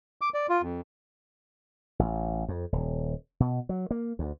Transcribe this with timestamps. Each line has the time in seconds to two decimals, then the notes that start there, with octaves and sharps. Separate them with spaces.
0.21 D6
0.34 D5
0.49 F4
0.62 F2
1.99 A1
2.48 F2
2.72 D#1
3.40 B2
3.69 F#3
3.91 A#3
4.19 D2